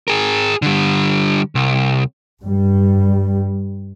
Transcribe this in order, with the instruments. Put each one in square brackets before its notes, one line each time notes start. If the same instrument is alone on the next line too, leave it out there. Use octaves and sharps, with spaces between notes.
[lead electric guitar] G#4 A#4
D3 G3
C2
[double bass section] G2 G3